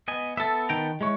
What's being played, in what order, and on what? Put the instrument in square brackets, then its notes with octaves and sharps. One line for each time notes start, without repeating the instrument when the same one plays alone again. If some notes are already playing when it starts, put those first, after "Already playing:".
[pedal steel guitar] B3 D#5 G#5
[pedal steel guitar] B3 A5 [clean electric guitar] A4 E5
[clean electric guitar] D#3 G5 A#5
G#3 E4 C#5